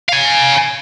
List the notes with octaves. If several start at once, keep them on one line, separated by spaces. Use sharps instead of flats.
F5 G#5